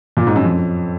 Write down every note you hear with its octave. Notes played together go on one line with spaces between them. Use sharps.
A#2
G#2
F#2
F2